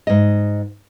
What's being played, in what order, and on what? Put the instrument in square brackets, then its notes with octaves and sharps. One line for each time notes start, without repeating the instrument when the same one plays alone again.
[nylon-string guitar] G#2 D#5